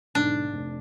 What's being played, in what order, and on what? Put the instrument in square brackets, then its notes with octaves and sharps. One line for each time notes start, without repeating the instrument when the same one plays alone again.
[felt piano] B1 G#2 D3 [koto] D4
[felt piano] F1